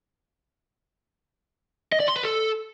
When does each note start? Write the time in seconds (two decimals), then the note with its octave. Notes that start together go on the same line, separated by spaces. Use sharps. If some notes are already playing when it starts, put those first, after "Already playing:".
1.92 D#5
2.00 D5
2.08 C6
2.16 B4
2.23 A4